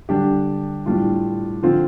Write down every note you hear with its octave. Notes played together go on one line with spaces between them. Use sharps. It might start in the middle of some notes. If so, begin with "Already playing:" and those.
D3 G3 D4 G4
A2 G3 D4 F4
D3 F3 C4 F4